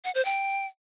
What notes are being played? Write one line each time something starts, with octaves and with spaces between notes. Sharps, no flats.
F#5
C5
G5